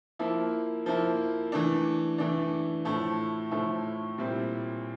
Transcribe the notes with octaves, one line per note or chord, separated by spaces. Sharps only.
F3 A#3 E4
F3 A#3 E4
E3 A3 D4
E3 A3 D4
A2 F3 A3 E4
A2 F3 A3 E4
A#2 G3 C4 E4